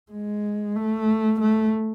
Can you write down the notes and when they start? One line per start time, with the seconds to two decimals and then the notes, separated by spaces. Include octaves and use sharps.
0.12 G#3
0.76 A3
1.40 A3